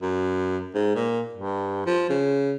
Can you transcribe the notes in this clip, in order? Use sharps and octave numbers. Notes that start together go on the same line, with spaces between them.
F#2
G#2
A#2
G2
F3
C#3